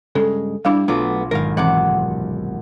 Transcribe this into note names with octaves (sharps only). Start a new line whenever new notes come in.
G2 C#3 G#3 A4
G2 G3 D4 E4 F5
B1 F#3 A3 B3 F4 D6
G#1 A#4 F5
B1 F#2 C3 E3 F#5 D6